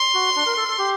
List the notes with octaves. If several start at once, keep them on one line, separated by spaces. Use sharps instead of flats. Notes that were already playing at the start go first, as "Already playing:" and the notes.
Already playing: C6
F#4
D4
A#4
A4
A4
G4